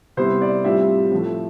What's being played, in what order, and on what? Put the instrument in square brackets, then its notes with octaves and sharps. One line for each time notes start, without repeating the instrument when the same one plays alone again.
[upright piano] C3 G3 B3 E4 C5
D5
A2 G3 C4 F4 E5
A2 F3 A3